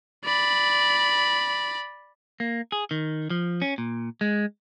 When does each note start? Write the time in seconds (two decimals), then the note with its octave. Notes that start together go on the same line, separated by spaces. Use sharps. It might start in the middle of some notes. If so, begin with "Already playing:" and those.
0.25 D5 B5
2.40 A#3
2.72 G#4
2.91 D#3
3.30 F3
3.62 C#4
3.78 A#2
4.21 G#3